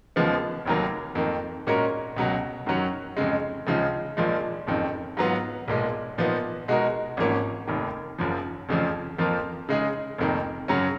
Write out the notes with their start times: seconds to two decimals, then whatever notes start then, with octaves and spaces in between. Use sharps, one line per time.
0.16 D#2 C#3 F3 G#3 B3
0.66 F1 D#2 D#3 F#3 A#3
1.15 F2 D#3 A#3
1.67 A#2 G#3 C#4 F#4 A#4
2.17 C#2 B2 F#3
2.66 F#2 D#3 F#3 C#4
3.17 F2 C#3 G#3
3.67 C#2 C#3 F3 G#3 D#4
4.17 A#1 A#2 F3 G#3
4.67 F#1 F2 D#3
5.17 G#2 F#3 B3 F4
5.68 B1 A#2 G#3
6.18 A#2 F3 B3 D#4
6.68 B2 G#3 D#4 F#4 A#4
7.17 G#1 G#2 F3 A#3 C#4
7.67 F1 D#2 D#3
8.18 F#1 F#2 F3
8.69 F1 F2 C#3 F3
9.18 F2 F3 A#3 F4
9.69 C#3 G#3 D#4 G#4
10.18 F1 F2 D#3 A#3
10.68 F#2 C#3 F#3 C#4